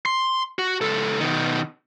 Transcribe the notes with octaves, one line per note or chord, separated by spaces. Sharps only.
C6
F#4
C#2 A4
B2 D#3